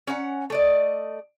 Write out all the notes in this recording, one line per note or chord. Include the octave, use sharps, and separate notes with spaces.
C#4 D4 F#5 A#5
A3 D5 D#5